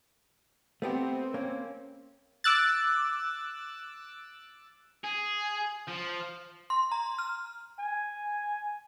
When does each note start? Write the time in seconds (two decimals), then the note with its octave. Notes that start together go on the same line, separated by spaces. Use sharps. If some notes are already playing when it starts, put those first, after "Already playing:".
0.82 A3 B3 C4 G4
1.34 A#3 C#4
2.44 D6 E6 F#6 A6
5.04 G#4
5.88 F3
6.70 C6
6.92 A#5
7.18 F6
7.79 G#5